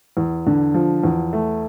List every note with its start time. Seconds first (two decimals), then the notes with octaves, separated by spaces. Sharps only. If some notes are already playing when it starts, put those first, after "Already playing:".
0.17 E2
0.46 D3
0.74 F3
1.04 E2
1.33 A3